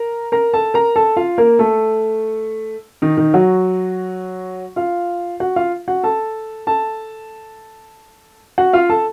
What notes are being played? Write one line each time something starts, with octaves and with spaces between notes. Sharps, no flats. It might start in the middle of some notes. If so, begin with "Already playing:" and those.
Already playing: A#4 A#5
A#4 A#5
A4 A5
A#4 A#5
A4 A5
F4 F5
A#3 A#4
A3 A4
D#3 D#4
D#3 D#4
F#3 F#4
F4 F5
F#4 F#5
F4 F5
F#4 F#5
A4 A5
A4 A5
F#4 F#5
F4 F5
A4 A5